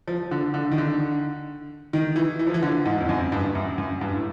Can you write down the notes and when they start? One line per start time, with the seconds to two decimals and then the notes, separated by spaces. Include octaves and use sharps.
0.08 F3
0.31 D3
0.54 D3
0.72 D#3
0.78 D3
1.93 D#3
2.16 E3
2.39 E3
2.47 F3
2.54 E3
2.62 D3
2.86 G#2
3.00 F2
3.09 F#2
3.32 G2
3.55 F#2
3.78 F#2
4.01 G2
4.15 A2